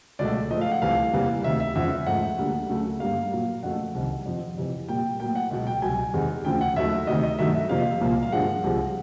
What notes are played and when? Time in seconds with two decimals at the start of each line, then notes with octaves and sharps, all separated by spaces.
0.19 C#2 B2 F#3 A3 D5
0.50 A2 F3 A3 D#5
0.61 F5
0.72 F#5
0.82 C2 C3 E3 A3 F5
1.12 E2 C3 E3 G3 A#3
1.44 D2 C3 D#3 E5
1.60 E5
1.75 E2 C#3 F3 G#3 E5
2.06 G#2 F3 A3 F#5
2.38 D2 D3 G3 A#3
2.69 D2 C#3 F#3 A3
3.00 G2 D3 G3 A#3 F5
3.32 A#2 F#3 A#3
3.63 F2 C#3 F#3 A3 F#5
3.95 C2 C3 D#3
4.26 F2 C3 F3
4.57 F2 C3 E3
4.88 A#2 G3 A#3 G5
5.20 A2 F#3 A#3 G5
5.35 F#5
5.51 C#2 B2 F#3
5.67 G5
5.82 C2 B2 F#3 G#5
6.14 E2 C3 D#3 G#3
6.45 D2 C#3 F3 G5
6.61 F#5
6.76 D#2 D#3 F#3 A3 E5
7.07 D2 C3 D#3 D#5
7.23 D#5
7.39 G2 D#3 F#3 A3 E5
7.54 E5
7.69 F2 C3 F3 A#3 F5
8.01 C2 A#2 F3 A#3
8.23 F5
8.32 G2 D3 F3 G#3 F#5
8.64 C2 C3 F3 G#3